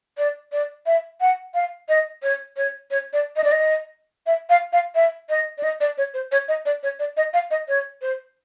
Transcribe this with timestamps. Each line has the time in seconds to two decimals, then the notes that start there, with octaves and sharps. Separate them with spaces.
0.18 D5
0.52 D5
0.86 E5
1.21 F#5
1.54 F5
1.89 D#5
2.23 C#5
2.57 C#5
2.91 C#5
3.13 D5
3.36 D#5
3.44 D5
3.52 D#5
4.27 E5
4.50 F5
4.73 F5
4.95 E5
5.30 D#5
5.58 D5
5.63 D#5
5.80 D5
5.98 C#5
6.14 C5
6.32 C#5
6.48 D#5
6.66 D5
6.83 C#5
6.99 D5
7.17 D#5
7.34 F5
7.51 D#5
7.68 C#5
8.02 C5